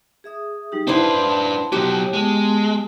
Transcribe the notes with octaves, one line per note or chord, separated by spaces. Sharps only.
G#4 E5 D#6
G3 D#4 G4
D4 E4 B4 C5 F#5 A5 C6
B2 F#3 G4
G#3 B3 A5